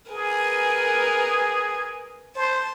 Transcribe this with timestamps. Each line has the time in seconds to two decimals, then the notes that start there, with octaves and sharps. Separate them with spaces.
0.11 G#4 A#4 B4 G#5
2.36 C5 A5